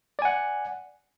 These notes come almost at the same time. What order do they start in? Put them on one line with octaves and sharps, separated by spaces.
D5 G#5 F#5